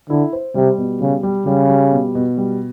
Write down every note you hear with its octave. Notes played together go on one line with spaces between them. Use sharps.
D3 E4
C5
C3 G3
B2
C#3 G3
G3
C#3 G3
G3
B2
B2
G3